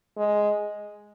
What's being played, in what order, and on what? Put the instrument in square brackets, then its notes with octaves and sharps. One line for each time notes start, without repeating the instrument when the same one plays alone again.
[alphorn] G#3